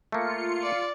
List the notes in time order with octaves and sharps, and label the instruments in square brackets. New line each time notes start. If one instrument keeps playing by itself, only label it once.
[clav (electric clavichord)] A3 A#3 [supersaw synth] F4 C#7
[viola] D5